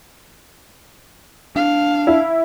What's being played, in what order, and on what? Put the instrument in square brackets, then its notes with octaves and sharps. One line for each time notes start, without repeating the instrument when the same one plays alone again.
[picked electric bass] D4 [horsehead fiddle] F5
[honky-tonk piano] E4